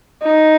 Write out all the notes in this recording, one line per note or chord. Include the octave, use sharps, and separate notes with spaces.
D#4